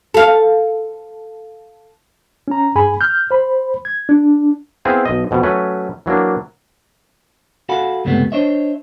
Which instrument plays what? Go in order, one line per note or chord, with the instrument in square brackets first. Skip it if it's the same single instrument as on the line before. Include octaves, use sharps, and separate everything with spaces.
[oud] A4 F5
[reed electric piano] C#4 A#5
G2 G#4 G#5 B5
F6 G6
C5 B5
G#6
D4
[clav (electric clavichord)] B3 C4 E4 G#4 F5
B1 D#5
F2 B2
F#3 A3 C#4 B4
E3 F#3 A#3 D4
[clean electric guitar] F#4 A4 F5 F#5 G#5 B5
C#2 G2 C3 G3 A3 B3
D4 C5 C#5 D#5 E5